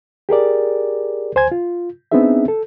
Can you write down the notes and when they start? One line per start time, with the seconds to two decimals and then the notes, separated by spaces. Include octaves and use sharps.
0.29 G4 G#4 A#4 D5
1.35 D2 C5 G#5 G#6
1.52 F4
2.12 B3 C4 D4 D#4 G#4 E5
2.48 A4